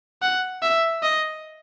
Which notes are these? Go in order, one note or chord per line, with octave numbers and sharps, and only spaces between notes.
F#5
E5
D#5